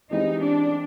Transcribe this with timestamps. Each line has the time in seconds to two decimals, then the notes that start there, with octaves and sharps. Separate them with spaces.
0.11 E3 G#3 C4 D#4 E4 G4
0.41 D4